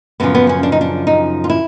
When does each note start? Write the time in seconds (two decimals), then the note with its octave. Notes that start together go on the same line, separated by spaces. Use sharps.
0.20 F#2 C#3 F3 B3
0.35 B3
0.49 C#4
0.63 D4
0.72 D#4
0.81 D4
1.07 D#4
1.44 F4
1.50 E4